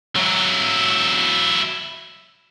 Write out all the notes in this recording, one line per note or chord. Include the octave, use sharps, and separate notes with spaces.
F#3 E4